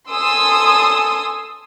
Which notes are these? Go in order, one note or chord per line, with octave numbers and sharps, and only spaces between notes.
A4 G#5 C6 D#6 E6